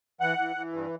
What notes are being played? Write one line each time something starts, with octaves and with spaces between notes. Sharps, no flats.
E3 F#5
E3
E3
G2